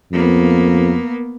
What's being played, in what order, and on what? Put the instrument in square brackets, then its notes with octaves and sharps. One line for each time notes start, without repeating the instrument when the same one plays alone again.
[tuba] F2 [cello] A#3 B3